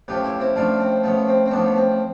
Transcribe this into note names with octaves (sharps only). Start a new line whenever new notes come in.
A1 A2 F3 G4 B4
E4 G4
C4 E4
A1 A2 F3 D4 F4
C4
A1 A2 F3 B3
C4
C4
A1 A2 F3 B3 D4
B3
C4